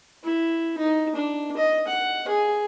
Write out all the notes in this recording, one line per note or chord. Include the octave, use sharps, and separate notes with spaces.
E4
D#4
D4
D#5
F#5
G#4